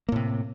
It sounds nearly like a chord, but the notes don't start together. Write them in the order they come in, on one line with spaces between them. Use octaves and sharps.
A#3 A2 C3